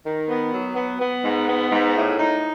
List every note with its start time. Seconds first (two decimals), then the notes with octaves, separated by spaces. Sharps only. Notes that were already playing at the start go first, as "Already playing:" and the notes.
0.05 D#3
0.29 B3
0.52 F#3
0.75 B3
1.00 B3
1.24 G#2
1.47 B3
1.72 G#2
1.96 A2
2.18 D#4